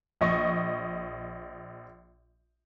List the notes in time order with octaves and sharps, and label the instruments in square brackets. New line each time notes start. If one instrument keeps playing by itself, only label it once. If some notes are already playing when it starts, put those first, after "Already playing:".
[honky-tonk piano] A#1 D#5 C#6